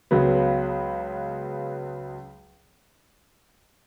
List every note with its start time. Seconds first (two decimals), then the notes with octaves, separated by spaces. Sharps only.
0.11 C#2 C#3 F#3 B3